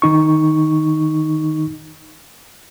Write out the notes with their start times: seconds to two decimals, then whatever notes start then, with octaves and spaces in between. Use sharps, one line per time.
0.02 D#3 D#4 C#6